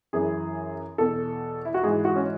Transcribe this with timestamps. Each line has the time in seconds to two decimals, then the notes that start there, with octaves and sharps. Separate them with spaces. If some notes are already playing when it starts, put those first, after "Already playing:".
0.13 F#2 E3 G#4
0.98 E2 B2 A4
1.65 E4
1.74 F#4
1.83 G#2 E3 G#4
2.05 F#4
2.16 C#4